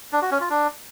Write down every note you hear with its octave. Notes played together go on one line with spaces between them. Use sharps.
D4
F#4
C#4
F4
D4